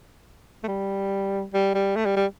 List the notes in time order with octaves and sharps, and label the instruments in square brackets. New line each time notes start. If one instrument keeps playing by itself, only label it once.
[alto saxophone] A3
G3
G3
G3
A3
G3
G3